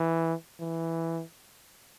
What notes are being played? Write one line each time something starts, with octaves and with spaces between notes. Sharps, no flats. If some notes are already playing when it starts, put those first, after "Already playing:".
Already playing: E3
E3